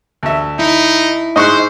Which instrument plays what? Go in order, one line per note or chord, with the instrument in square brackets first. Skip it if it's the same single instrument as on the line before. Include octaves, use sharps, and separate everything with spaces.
[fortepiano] D2 E5
[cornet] D#4 [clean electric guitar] E4
[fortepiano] G#2 F#6 [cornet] C5 [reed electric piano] D#5 C#6